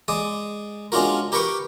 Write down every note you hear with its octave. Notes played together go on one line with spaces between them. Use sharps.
G#3 D5 D#6
G#3 C#4 D4 F4 F#4 A#4
G4 A#4 B4 G5 C#6 D6